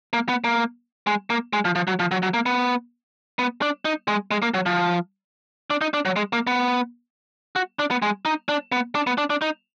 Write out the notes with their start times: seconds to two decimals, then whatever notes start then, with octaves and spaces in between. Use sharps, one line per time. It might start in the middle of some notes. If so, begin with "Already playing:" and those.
0.13 A#3
0.29 B3
0.44 A#3
1.07 G#3
1.30 A#3
1.53 G#3
1.65 F3
1.75 F3
1.87 F#3
1.99 F3
2.11 F#3
2.23 F#3
2.34 A#3
2.46 B3
3.39 B3
3.62 D4
3.85 D#4
4.08 G#3
4.31 G#3
4.42 A#3
4.54 F#3
4.66 F3
5.70 D4
5.81 D#4
5.94 D4
6.05 F#3
6.16 G#3
6.33 A#3
6.47 B3
7.56 F#4
7.79 D4
7.91 B3
8.02 G#3
8.25 D#4
8.49 D4
8.72 B3
8.95 D4
9.07 B3
9.18 D4
9.30 D4
9.42 D#4